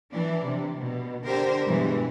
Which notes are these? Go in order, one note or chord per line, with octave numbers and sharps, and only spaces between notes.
E3 D4
C3
B2
D3 G4 A#4 C5
G2 B2 E3 G3 G#3